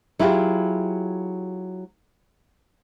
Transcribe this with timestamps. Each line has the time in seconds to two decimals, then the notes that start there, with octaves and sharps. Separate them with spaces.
0.19 F#3 E4 F4 G4 G#4